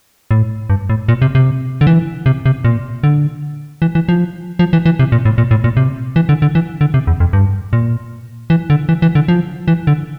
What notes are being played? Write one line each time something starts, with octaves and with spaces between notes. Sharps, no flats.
A2
G2
A2
A#2
C3
C3
D3
E3
C3
C3
A#2
D3
E3
E3
F3
F3
E3
E3
C3
A#2
A2
A#2
A2
A#2
C3
E3
D3
D3
E3
D3
C3
E2
F2
G2
A#2
E3
D3
E3
E3
D3
F3
E3
D3